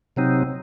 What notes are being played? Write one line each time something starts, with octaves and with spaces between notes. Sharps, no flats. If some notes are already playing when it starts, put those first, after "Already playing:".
C3 F#3 C4 D#4